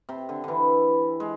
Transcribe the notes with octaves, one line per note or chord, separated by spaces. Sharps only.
C3
D3
D3 E3
G#3